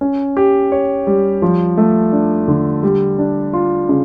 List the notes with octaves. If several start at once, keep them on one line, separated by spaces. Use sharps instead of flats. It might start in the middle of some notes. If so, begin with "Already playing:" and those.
C#4
G4
C#5
G3
F3
A3
D4
D3
G3
D4
F4
C#3